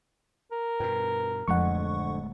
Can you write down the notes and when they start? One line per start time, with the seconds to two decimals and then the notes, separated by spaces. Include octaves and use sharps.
0.51 A#4
0.80 G2 B2 B4 G5
1.48 D1 F2 D3 G#3 A3 F#5 C#6